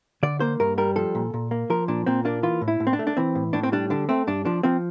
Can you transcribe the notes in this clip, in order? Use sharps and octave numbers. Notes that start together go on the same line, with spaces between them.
D3 D5
A#3 C5
G2 A#4
G3 A#4
F3 A4
A#2
A#2
A#3
F3 A#4
A#2 D4
A#2 C4
A#3 D4
E3 F4
A2
E4
A2
C4
D4
A3
D4
E3 C4
A2
A2 D4
C4
G3 D4
D3 D4
A3 C4
G2 D4
F3 D4
F3 C4